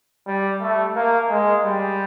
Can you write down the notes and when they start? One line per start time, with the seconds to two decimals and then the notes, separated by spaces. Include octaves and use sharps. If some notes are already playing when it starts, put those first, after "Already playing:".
0.27 G3
0.61 A3
0.95 A#3
1.30 G#3
1.65 G3